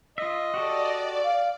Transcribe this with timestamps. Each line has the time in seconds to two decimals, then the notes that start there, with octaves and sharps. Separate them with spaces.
0.18 F4 D#5 E5
0.54 F#4 G4 A4 D5
1.24 F5